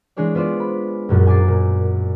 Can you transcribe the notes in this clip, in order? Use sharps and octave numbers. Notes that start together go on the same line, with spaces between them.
E3 G#3 D4 G#4 C#5 D5
B3 F4 C5 D5
B5
A#1 F#2 A#2 F#3
G#5 D6 A6 C7
A#2